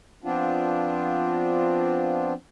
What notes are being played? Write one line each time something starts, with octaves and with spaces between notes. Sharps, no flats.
F3 B3 C4 D4 F4